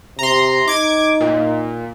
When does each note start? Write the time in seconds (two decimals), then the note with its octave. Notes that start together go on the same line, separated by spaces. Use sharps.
0.19 C3 A#5 C6
0.68 D#4 D6 G#6
1.21 A#2